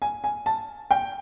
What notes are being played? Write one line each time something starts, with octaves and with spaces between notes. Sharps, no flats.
G#5
G#5
A5
G5